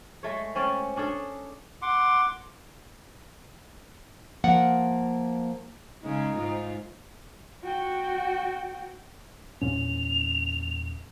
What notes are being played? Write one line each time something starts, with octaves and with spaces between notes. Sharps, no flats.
G#3 A3 C#5
C4 C#4 C#5 D5
C#4 D4 G#4 A4
F#5 C6 D6
F3 A#3 F#5
C#3 G#3 D#4
G#2 F4
F#4 G5
E2 A#2 C#4 F7